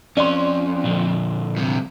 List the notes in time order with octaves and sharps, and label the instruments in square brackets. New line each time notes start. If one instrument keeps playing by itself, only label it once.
[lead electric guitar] F2 [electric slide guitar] C#4 [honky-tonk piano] D5 C6
[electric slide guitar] A#2 D3 F3
[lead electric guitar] G2 C3